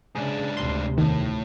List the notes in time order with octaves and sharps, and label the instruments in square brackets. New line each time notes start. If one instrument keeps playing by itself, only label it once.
[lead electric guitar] G#2 D4 [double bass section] C#3 [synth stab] G#4
[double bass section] D2 C3 [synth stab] C6
[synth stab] E2 D#3 [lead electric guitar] A2